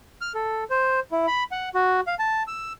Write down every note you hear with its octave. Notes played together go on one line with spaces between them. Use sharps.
F6
A4
C5
E4
B5
F#5
F#4
F5
A5
E6